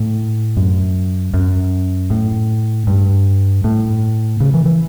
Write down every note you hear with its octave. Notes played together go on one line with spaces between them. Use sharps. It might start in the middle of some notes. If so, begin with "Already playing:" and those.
Already playing: A2
F#2
F#2
A2
G2
A2
C#3
E3
E3